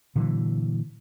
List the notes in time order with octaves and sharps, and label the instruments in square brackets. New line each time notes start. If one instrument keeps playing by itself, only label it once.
[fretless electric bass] A#2 D3 E3 F#3